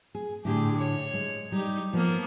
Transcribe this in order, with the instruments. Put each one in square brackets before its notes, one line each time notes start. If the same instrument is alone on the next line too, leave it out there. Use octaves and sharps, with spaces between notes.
[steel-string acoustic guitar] G#4
[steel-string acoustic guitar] A2 D3 [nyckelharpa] G4 G#4
[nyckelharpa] C#5
[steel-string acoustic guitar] G#3
[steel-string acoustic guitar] G3 [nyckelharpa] D#4 G4
[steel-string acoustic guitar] F3 [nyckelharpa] A#3 B3